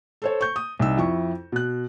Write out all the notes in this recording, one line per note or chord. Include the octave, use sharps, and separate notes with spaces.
A4 C5 C#5
C#6 G6
D#6
C2 D#4 E6
F2 E4 C#6
B2 F#6